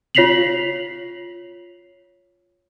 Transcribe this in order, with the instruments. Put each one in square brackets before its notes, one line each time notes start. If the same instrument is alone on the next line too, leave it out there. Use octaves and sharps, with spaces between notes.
[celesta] F4 C#5 B6 C7 F7 F#7